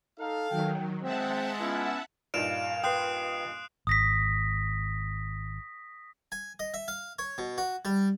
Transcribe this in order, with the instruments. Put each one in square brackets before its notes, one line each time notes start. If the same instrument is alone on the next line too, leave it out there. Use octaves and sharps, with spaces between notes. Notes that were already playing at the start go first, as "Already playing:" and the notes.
[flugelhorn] D#4 [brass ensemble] A4 F5
[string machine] D#3 F#3 [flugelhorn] G5
[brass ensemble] G#3 [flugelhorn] C4 [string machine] E5 F#5 A5
[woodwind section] B3 C#4 E4 [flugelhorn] F4
[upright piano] G2 A#2 D#4 [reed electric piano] D5 [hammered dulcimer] F5 [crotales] D7 E7 F7
[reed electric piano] B4 G5 [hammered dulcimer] C6 [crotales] D#6 F#6 C7
[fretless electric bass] G#1 [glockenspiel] D#6 A#6 B6
[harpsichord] G#5
D#5
E5
F5
C#5
B2
F#4
G3